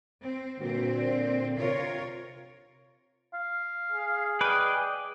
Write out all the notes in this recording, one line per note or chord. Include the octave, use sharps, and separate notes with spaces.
C4
G2 A#2 D3 C4 F#4
A#3 C5 D5
C3 F4 A#4 C#5
F5
G#4
B4 D5 D#5 G5